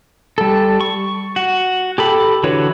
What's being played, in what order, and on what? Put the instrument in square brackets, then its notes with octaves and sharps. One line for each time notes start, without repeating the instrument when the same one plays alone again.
[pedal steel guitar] G3 A4
C#6
F#4
G4 A4 B5
D3 E3 F#4 B4 C#5